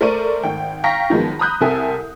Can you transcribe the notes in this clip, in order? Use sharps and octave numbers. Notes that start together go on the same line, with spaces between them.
A3 A#4 C5 D5 C#6 D#7
G#1 G5
F5 G5 A#5 C#6 A#6 B6
D#3 F3 F#3 G#3 B3
A#5 B5 D#6 F#6 G6
C2 C4 A4 A#4 E5 G#5